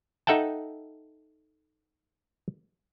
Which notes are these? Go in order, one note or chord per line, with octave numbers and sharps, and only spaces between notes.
D#4 A4 E5 F#5 G5 A5